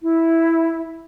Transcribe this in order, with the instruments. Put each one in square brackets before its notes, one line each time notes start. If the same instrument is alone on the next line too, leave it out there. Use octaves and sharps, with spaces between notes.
[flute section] E4